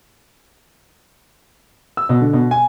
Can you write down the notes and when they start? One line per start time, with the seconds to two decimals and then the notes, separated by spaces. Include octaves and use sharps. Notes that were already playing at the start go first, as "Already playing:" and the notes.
1.97 E6
2.09 B2
2.21 D3
2.33 B2
2.51 G#5